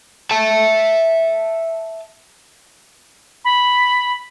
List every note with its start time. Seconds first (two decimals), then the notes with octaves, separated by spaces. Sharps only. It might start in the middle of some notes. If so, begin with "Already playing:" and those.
0.31 E5 A5
3.45 B5